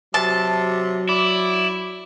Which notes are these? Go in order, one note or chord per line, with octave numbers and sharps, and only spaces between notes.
C3 F#3 A5
E4 D5